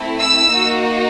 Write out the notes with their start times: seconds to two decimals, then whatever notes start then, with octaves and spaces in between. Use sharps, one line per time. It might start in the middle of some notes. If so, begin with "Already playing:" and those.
Already playing: A3 C4 E4
0.19 E6
0.49 A#3 D#4 F#4